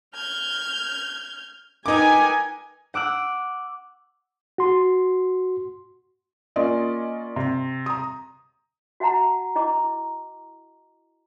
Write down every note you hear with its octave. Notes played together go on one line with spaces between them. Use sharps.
F6 G6 G#6
D#4 A#4 B4 G5 G#5 D6
F#5 D6 E6 F#6
F#4 C6
A#3 C#4 F4 D5 D#5
C3
A#5 D#6
F#4 E5 F#5 A5 A#5
E4 D#5 A#5 D6